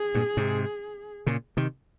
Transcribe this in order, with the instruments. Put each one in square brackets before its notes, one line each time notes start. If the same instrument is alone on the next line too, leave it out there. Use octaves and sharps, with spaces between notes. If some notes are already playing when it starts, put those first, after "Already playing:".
Already playing: [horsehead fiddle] G#4
[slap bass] G2 A#2
G#2 C3
A#2 C#3
C3 D#3